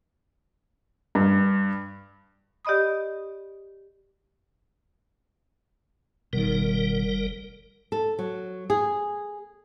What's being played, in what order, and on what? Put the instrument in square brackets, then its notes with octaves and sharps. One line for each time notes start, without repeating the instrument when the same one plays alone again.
[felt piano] G2
[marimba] G4 D5 D#5 B5 D#6
[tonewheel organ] F#1 G3 A#4 [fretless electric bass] B2 D#3
[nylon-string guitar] A4
F#3
G#4